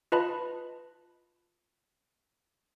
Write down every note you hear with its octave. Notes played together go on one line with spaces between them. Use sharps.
F4 B4 D#5 A5 B5